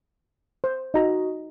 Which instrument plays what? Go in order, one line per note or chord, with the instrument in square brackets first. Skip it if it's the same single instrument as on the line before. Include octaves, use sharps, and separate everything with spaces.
[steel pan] C5
[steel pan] D#4 A#5 [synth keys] F#4 D#5